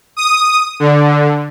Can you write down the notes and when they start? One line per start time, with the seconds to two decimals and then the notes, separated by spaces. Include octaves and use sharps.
0.17 D#6
0.80 D3